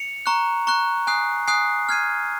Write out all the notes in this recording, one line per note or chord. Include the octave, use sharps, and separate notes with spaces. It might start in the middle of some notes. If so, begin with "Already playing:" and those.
Already playing: C#7 F7
A#5 C#6 F#6
A#5 C#6 F#6
G#5 D#6 F#6 C7
G#5 D#6 F#6 C7
F6 G#6 C7 D#7